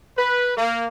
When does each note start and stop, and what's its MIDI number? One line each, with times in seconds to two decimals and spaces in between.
0.17 0.53 71
0.56 0.86 58